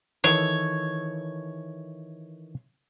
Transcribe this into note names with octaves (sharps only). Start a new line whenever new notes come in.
D#3 E3 A4 C#5